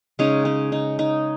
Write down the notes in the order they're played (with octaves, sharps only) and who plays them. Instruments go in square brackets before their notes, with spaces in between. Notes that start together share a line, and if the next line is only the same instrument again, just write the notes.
[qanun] C#3 G#3 C#4 D#4
C#4
D#4
D#4